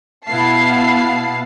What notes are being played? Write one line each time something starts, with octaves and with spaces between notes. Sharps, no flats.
B2 B3 E4 F5 A5 C7